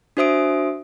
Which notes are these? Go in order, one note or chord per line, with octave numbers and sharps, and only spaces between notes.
D4 F#4 C5 E5 D#6 D7